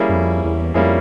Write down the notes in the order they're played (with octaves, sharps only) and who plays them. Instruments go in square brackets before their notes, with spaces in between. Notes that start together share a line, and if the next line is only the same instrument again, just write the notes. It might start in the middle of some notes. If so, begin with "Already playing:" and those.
Already playing: [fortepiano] G3 A#3 C#4 E4 G#4
[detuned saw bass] F#2
F2
E2
[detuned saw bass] F2 [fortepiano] G3 A#3 C#4 E4 G#4